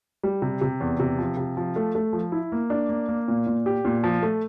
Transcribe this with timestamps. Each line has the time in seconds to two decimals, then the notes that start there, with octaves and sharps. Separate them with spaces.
0.23 G3
0.42 C3
0.61 C3
0.81 E2
0.99 C3
1.19 F3
1.37 C3
1.57 F3
1.76 A3
1.95 A3
2.13 F3
2.32 E4
2.52 A#3
2.70 D4
2.89 A#3
3.09 A#3
3.28 A#2
3.47 A#2
3.66 G4
3.85 A#2
4.04 F3
4.22 A3